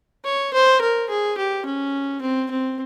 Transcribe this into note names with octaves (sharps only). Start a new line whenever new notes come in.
C#5
C5
A#4
G#4
G4
C#4
C4
C4